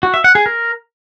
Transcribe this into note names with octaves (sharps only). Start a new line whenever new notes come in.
F#4
E5
F#5
G#4
A#4